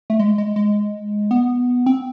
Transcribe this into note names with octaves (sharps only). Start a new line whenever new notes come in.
A3
G#3
G#3
G#3
B3
C4